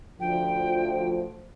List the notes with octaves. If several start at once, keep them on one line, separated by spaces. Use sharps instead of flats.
D2 F3 G5